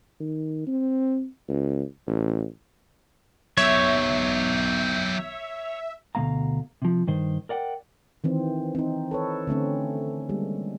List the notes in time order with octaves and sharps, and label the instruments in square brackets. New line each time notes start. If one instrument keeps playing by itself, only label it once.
[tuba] D#3
C4
C#2
A1
[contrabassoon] B1 [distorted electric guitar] F#3 G4 [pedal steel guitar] C#5 [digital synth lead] E5
[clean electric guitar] D2 B2 A3 A#3 F5 A#5
C3 F3
G2 D#3 C5
A#4 D5 F#5 G5
[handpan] D#3 E3 C4
C4 D#4
A4 B4 C#5
D3 A3 C4 C#4
G3 G#3 A#3